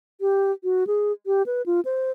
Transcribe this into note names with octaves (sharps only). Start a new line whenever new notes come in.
G4
F#4
G#4
G4
B4
F4
C5